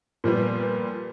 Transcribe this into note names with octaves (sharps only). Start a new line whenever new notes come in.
A#2 F3 G3 B3